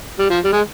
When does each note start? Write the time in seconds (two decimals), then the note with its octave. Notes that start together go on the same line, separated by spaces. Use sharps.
0.19 G3
0.30 F3
0.45 G3
0.52 G#3